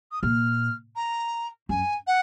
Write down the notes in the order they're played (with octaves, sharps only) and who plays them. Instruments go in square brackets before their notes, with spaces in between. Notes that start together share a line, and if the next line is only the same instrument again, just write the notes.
[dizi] D#6
[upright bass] A#2 [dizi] F6
[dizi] A#5
[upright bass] F#2 [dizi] G#5
[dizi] F#5